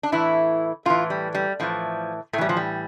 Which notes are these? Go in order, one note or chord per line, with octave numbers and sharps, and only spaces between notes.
D4
A2 E3 E4
A2 E3 F4
G3
G3
A2 E3 F3
A2 E3 G3 A3
F3
G3